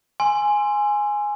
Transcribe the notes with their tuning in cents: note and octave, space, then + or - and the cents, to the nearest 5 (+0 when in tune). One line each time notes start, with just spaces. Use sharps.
G#5 +0 C6 +0 E6 +30